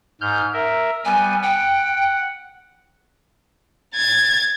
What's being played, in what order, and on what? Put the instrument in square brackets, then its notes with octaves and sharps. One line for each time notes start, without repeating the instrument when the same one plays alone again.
[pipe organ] G#2 F6 G6
A#4 E5
[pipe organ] G3 B3 [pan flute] G#5
[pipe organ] F#5 [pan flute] G5
[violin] G#6 A6